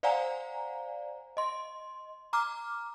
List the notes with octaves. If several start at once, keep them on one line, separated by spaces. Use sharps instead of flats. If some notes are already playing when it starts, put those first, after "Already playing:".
C5 D5 F5 F#5 G#5 A#5
D#5 C6
A#5 D6 F6